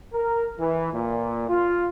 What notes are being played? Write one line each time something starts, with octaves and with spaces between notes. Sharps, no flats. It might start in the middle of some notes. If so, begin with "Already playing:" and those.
A#4
E3
A#2
F4